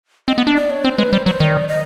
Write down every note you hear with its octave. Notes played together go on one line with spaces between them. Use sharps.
C4 D#5
B3
D4
D5
C#5
C4 C5
G#3 B4
G3 C5
F#3 C5
D#3 D5 D#5
D#5